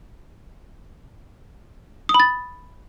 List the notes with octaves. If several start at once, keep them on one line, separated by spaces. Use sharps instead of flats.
D#6
B5
A6